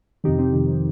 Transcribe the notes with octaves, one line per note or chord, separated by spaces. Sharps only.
F2 C3 D#3 D#4 G4
C4 D#4
F2 C3 D#3